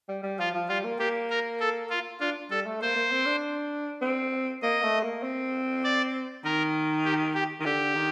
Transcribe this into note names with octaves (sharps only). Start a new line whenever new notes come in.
G3
G3
F3 F4
F3
G3 F4
A#3
A#3 G4
A#4
A4
F4
D4 F4
G3 A4
A3
A#3 C5
A#3
C4
D4
C4
A#3 D#5
A3
A#3
C4
D5
D#3 A#4
G4
G4
D#3
D3 G4
D#3